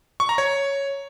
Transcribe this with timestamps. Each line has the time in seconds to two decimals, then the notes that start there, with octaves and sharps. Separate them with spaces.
0.20 C#6
0.29 A#5
0.38 C#5